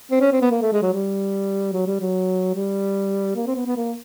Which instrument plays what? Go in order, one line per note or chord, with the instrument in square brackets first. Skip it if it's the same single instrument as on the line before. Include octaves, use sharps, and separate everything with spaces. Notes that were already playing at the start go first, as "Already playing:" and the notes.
[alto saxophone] C4
C#4
C4
B3
A#3
A3
G#3
F#3
G3
F#3
G3
F#3
G3
A#3
C4
B3
B3
A#3